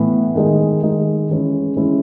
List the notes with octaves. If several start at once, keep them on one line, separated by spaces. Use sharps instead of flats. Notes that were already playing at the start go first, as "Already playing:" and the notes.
Already playing: A2 E3 B3
D#3 G#3 D#4
D#3 G#3 D#4
E3 G#3 C#4 E4
E3 G#3 C#4 E4